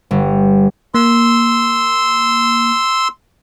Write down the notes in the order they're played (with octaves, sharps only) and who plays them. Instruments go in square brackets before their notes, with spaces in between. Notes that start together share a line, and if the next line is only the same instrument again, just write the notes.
[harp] G1
[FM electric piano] A#3 [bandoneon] C6 E6